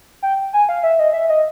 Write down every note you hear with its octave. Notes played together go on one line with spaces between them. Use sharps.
G5
G#5
F5
E5
D#5
E5
D#5